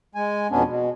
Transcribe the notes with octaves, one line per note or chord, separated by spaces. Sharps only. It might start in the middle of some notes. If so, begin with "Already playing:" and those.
G#3 G#5
F2 B2 B3 C#4 D4
B2